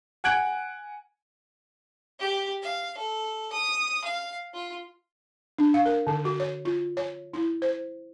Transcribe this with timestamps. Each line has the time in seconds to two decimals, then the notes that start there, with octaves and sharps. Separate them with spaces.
0.24 F#5 G#5 F#6 G#6 D7 F#7
2.20 G4
2.62 F5
2.97 A4
3.52 D#6
4.04 F5
4.54 F4
5.58 D4
5.74 F5
5.86 A#4
6.07 D3
6.25 F#4
6.40 C#5
6.65 F4
6.97 C#5
7.34 E4
7.62 C5